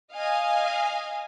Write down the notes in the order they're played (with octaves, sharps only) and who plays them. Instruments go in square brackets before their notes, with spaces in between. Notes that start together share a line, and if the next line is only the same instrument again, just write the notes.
[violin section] D#5 F5 G#5